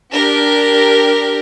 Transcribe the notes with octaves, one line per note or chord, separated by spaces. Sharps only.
D4 G4 A#4